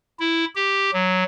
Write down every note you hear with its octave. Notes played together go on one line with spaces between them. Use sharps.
E4
G4
F#3